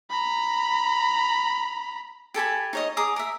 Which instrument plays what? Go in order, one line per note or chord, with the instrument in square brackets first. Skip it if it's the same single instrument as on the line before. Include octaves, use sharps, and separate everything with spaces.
[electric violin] A#5 B5
[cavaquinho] G4 A4 G#5 B5
D#4 C#5 D#5
G#4 A#5 D6 D#6
A#4 E5